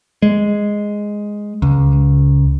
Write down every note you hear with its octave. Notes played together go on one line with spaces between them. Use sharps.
G#3
C#2